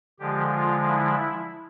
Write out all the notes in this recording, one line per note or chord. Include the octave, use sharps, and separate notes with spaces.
D3 F3 G#3 G4
F4
E4